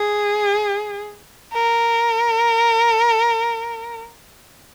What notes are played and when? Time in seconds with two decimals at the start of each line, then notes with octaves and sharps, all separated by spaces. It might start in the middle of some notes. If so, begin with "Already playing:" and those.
Already playing: G#4
1.54 A#4